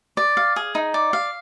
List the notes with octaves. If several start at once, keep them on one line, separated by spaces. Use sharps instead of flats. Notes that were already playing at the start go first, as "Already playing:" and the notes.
D5
F5
G#4
D#4
D5
F5